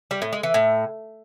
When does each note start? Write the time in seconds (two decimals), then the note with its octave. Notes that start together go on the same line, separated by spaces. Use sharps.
0.11 G3
0.22 A2
0.33 G#3
0.43 E3
0.54 A2